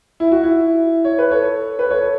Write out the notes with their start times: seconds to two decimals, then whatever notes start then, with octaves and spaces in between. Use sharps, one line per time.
0.20 E4
0.32 F#4
0.43 E4
1.04 C#5
1.18 B4
1.31 A4 C#5
1.79 B4
1.90 A4 C#5